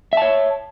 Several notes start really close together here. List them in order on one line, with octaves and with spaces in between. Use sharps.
E5 A5 C#5